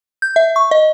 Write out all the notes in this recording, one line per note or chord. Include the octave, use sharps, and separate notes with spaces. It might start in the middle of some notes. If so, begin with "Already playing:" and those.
G6
E5
C#6
D#5